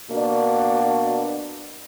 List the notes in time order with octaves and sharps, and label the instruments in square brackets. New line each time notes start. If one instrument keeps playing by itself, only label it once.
[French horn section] B2 A#3 D4 F#4 D5